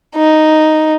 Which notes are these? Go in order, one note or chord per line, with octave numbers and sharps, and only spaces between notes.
D#4